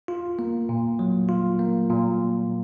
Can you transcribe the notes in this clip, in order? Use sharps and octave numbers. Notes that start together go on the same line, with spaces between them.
F4
A#3
A#2
F#3
F4
A#3
A#2